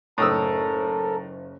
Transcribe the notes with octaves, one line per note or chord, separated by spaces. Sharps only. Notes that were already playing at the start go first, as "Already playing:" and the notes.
F#1 A2 D#4 A4 A#4 C#5 D#6 E6